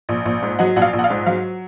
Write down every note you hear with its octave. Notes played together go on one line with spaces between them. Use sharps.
A#1
A#1
G#2
F#3 D#5 F#5
A#1 F#5
F5
A#1
F#5
F5
G#2
F#3 F5